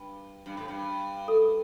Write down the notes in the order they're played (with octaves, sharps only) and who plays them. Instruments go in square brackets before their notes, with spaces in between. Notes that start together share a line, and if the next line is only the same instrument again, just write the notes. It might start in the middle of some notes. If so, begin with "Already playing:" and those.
Already playing: [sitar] G2
G2
A2
G2
[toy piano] A4